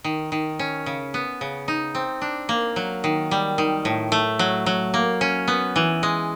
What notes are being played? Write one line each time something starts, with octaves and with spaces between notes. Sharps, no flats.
D#3
D#3
C#4
C#3
B3
C#3
D#4
C4
D4
A#3
F#3
D#3
G3
D#3
A2
A3
F#3
F#3
A#3
C#4
B3
E3
G#3